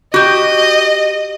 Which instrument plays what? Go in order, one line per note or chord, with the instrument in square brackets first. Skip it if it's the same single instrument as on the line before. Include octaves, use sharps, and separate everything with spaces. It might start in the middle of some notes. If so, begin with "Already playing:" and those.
[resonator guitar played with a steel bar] F#4 G4 [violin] D#5